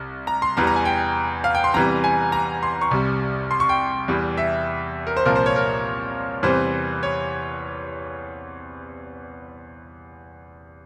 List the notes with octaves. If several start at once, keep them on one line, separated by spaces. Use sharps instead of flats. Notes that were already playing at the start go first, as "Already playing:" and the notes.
Already playing: C2
A#5
C6
E2 E3 G3 A#5
A#5
G#5
G5
F5
G5
C6
E2 C3 E3 G3 A#5
G#5
A#5
C6
C#6
C2 C3 G3
C6
C#6
G5
E2 E3 G3
E5
A#4
C5
C2 A#2 F3 A#4
C5
C#5
A#4
E2 C3 E3 G3 C5
C#5